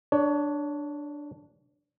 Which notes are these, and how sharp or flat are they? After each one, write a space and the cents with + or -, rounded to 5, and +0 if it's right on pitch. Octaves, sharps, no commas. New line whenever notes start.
D4 +0 C#5 +25